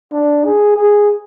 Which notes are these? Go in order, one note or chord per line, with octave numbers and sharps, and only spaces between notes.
D4
G#4
G#4